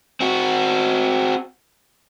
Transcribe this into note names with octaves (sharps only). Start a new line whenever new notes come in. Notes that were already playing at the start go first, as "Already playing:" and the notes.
C4 F#4